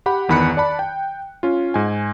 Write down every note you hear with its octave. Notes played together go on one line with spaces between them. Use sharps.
G4 F#5 B5
G1 E2 D#3 B5 F#6 C#7
D5 A5 B5
G5
C#4 F4
G#2 G#5